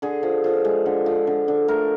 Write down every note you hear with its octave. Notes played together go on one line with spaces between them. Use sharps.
D3 G#4
F3
F3
G#3
D3
F3
D3
D3
A3 A#4